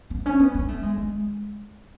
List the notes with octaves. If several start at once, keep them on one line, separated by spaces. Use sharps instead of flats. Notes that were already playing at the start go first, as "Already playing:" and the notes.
B3
C#4
B3
B3
A3
G#3
G#3